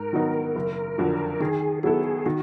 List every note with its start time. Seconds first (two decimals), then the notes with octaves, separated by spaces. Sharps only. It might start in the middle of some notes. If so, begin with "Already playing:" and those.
Already playing: G#2 A#4
0.13 D#3 F#3 B3 D#4
0.55 F#1
0.98 F2 D3 F#3
1.40 D#3 G#4
1.83 F#3 B3 E4 G#4 A4
2.26 D#3 F#4